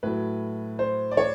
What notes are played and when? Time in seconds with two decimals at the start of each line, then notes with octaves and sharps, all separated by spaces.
0.03 A2 F#3 B4
0.79 C5
1.11 D5
1.17 C#5